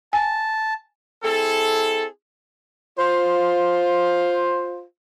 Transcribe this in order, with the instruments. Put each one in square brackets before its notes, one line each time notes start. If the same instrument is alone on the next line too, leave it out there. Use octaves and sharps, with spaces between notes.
[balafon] G#5 [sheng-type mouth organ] A5
[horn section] C4 E4 G#4 A4
F4 C5